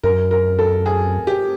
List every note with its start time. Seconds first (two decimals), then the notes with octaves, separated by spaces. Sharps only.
0.03 F#2 A#4
0.31 A#4
0.59 A4
0.86 G#4
1.27 G4